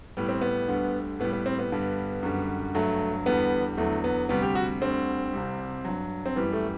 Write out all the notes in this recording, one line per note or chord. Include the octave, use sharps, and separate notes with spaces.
A2 G3 B3
C4
B3
D2 D3 G3
A2 G3 B3
B3
C4
B3
G2 D3 G3
F#2 D3 G3
G2 F#3 A3
E2 D3 G3 B3
E2 D3 F#3 A3
B3
D2 C3 G3 B3
G4
F#4
D2 D3 G3 C4
C2 C3 G3
G2 F#3
C4
F#2 E3 G3 B3
A3